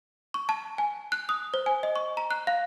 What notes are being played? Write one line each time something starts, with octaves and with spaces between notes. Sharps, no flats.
C#6
A5
G#5
F#6
D#6
C5
G#5
D#5
C#6
A#5
F#6
F5